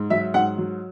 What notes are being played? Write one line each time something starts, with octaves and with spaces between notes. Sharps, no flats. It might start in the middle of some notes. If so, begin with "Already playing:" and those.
Already playing: G#2
F#3 E5
G#2 F#5
F#3